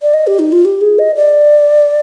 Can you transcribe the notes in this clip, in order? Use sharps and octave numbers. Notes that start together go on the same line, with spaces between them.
D5
D#5
G4
D#4
F4
G4
G#4
D#5
D5